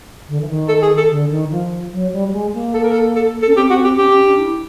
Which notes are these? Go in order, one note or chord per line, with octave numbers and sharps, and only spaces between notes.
D3
E3
D#3
A4
G#4
A4
D3
D#3
F3
F#3
G3
G3
G#3
A#3
A4
A#4
A4
A4
A4
C#4
C4 G4
C4 F#4
C4 G4
C#4 G4
C#4
D4
E4